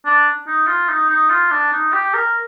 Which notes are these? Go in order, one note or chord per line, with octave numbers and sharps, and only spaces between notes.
D4
D#4
F4
D#4
D#4
F4
D4
D#4
G4
A#4